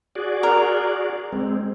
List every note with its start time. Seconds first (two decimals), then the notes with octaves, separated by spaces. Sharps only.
0.15 F#4 G#4 D5
0.43 A#4
1.32 G#3 C4